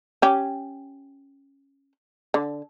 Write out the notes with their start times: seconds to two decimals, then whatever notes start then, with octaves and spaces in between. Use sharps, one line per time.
0.22 C#4 G4
2.34 D3